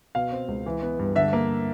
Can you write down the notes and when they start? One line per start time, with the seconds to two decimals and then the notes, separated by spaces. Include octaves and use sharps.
0.15 B2 F5
0.32 C4
0.48 C#2
0.66 E3
0.83 B3
0.99 G2
1.15 D3 E5
1.33 A#3